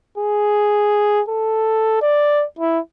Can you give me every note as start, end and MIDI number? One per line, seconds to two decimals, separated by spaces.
0.18 1.22 68
1.29 1.97 69
2.02 2.44 74
2.59 2.79 64